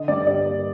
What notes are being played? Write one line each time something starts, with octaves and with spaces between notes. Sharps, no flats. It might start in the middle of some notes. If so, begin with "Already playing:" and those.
Already playing: D3 D#5
G2 D5
G3 D5
A#3